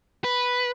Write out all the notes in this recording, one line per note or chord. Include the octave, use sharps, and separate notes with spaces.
B4